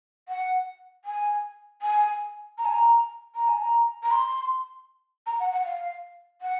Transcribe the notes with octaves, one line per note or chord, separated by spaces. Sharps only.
F#5
G#5
G#5
A#5
G#5
A#5
A#5
G#5
A#5
A#5
C6
A#5
F#5
F#5
F5
F#5